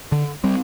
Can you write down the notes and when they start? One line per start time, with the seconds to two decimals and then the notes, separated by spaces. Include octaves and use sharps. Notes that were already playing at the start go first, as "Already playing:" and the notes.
0.12 D3
0.44 G3 C4